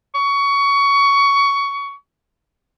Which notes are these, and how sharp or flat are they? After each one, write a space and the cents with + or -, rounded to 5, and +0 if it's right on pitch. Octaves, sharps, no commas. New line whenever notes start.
C#6 +20